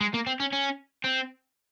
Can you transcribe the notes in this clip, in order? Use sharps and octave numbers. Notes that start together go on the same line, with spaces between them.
G#3
A#3
C4
C#4
C#4
C4